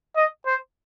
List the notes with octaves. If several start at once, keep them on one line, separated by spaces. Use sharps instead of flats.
D#5
C5